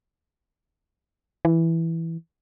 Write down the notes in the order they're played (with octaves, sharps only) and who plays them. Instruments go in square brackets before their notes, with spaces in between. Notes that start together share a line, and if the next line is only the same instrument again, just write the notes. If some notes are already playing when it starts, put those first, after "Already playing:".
[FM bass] E3